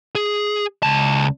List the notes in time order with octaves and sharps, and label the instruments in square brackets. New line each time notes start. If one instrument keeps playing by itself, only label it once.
[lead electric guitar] G#4
C#2 A5